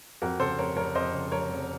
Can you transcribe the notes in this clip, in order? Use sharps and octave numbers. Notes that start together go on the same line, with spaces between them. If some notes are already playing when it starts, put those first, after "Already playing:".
F2 F#4 A#4
C#3 A4 C5
F1 A#4 C#5
F1 A#4 C#5
F2 C5 D#5
C#3
F1 A#4 C#5
F1